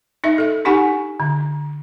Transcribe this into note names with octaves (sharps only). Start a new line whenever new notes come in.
D#4 D#5 E5
A4 E5
D4 D#4 G4 F#5 G#5 C#6
D3